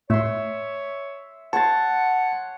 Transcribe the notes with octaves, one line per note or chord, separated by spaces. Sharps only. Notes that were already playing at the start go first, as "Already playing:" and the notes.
A2 C#5 E5 C6
C#5 F#5 A5 C6 A6